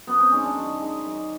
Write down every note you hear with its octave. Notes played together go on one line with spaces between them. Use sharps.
F#2 B3
C4
D#3 G#3 C#4
D4
F#2
D#3 G#3
F#2